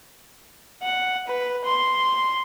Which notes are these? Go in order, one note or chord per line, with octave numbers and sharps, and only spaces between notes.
F#5
B4
C6